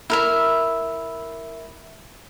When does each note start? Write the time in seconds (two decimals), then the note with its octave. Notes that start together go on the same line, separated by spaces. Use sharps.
0.10 E4 A#4 E5